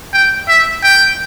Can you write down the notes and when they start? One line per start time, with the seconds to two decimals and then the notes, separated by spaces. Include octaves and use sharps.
0.13 G5
0.48 E5
0.84 G5